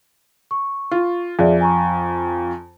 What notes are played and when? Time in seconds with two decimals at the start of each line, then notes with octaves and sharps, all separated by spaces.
0.51 C#6
0.91 F4
1.39 F2 G#4 D5 E5
1.61 G#5 A#5 C#6